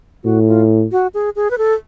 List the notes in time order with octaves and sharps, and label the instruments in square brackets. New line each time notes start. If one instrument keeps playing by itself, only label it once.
[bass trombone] A2 [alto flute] F#4
[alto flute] F4
F#4
G#4
G#4
B4
A4